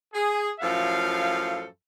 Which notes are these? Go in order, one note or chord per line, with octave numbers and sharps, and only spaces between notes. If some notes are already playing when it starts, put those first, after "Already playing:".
G#4
F#2 A2 F3 A4 F5